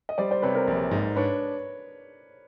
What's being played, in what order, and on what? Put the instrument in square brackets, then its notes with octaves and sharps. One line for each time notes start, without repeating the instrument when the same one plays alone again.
[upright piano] D#5
[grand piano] G3 [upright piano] C5 D5
[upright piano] C5 D5
[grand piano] C3 [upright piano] B4 C#5
[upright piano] A#4 C5
[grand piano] A#1
G#2
[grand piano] D4 [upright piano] B4 C#5